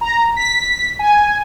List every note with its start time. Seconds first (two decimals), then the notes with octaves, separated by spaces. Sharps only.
0.01 A#5
0.37 B6
0.99 G#5